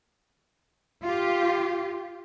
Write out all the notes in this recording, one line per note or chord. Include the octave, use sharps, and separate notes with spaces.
F4 G4